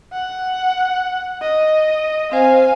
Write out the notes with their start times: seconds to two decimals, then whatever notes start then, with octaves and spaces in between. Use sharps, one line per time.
0.13 F#5
1.41 D#5
2.32 C4 C5 F5 G#5